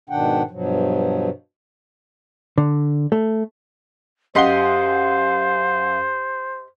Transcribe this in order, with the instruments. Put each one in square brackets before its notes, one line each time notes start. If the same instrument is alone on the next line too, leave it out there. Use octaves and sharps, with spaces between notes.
[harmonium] G#2 B2 D#3 D4 F#5 G5
G2 B2 F3 F#3
[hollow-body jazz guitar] D3
A3
[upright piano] F#2 F#5 G7 [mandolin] G4 D#5 C6 [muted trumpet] C5 [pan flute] F5